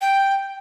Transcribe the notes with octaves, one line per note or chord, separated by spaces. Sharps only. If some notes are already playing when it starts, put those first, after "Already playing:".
G5